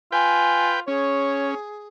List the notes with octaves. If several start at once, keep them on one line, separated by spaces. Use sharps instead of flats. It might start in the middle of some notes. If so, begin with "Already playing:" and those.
F4 B4 G5 G#5
C#4 G#4 C#5